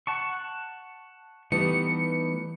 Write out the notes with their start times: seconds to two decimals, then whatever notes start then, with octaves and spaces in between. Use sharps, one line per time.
0.07 F#5 A5 C#6
1.52 E3 G3 A3 B3 D#4 C#7